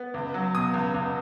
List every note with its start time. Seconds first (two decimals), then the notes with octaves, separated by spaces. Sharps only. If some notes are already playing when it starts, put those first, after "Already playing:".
Already playing: B3
0.14 C#2
0.34 F#3
0.54 B2 D#6
0.74 C#2
0.94 C#2